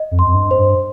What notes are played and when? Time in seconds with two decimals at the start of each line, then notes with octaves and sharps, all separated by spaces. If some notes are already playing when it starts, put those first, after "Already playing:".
Already playing: D#5
0.11 F2
0.19 C6
0.27 F2
0.34 G2
0.51 C5
0.58 G2